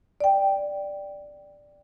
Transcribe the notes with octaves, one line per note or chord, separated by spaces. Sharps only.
D5 G5